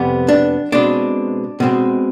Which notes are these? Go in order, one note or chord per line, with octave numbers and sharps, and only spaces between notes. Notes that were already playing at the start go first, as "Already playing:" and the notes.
Already playing: F2 C3 G3 B3
D4
B2 G#3 C4 D4
B2 G#3 C4